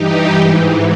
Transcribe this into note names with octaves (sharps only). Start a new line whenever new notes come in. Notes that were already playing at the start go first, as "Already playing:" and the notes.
Already playing: G2 E3 D#4 G4
G#2 E3